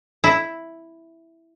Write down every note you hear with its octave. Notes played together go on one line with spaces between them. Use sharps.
E4